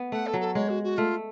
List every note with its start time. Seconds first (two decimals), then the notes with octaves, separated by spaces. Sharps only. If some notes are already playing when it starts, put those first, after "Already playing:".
Already playing: B3
0.12 A3 F#5
0.27 A4
0.33 F#3
0.41 A4
0.55 G#3 C#5
0.69 F#4
0.84 F#4
0.98 A3 F4